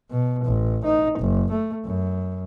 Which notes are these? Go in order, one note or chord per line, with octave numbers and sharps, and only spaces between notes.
B2
A1
D#4
F#1
A3
F#2